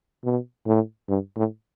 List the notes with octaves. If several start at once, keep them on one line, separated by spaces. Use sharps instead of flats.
B2
A2
G2
A2